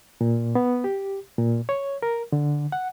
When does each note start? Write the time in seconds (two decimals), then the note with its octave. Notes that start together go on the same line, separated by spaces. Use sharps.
0.21 A#2
0.55 B3
0.84 G4
1.38 A#2
1.69 C#5
2.03 A#4
2.32 D3
2.72 F#5